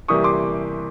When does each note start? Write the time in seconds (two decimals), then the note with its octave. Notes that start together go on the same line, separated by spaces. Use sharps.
0.08 C3 E3 G3 A#3 C#6 D#6
0.24 C6 D6